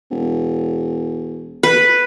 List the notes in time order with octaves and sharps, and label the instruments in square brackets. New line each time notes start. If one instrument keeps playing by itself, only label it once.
[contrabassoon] E1
[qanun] B4